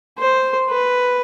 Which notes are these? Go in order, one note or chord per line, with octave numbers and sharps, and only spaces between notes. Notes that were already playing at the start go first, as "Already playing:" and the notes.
C5
B4